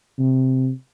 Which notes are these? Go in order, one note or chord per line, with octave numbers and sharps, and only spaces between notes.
C3